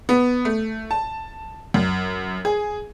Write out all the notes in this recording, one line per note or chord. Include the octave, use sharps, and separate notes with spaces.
B3
A3
A5
F#2
G#4